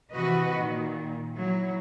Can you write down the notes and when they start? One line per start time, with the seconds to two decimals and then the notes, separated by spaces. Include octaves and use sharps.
0.13 C3 E3 F#4 B4 D#5
0.55 A#2 D#3
1.37 F#3 E4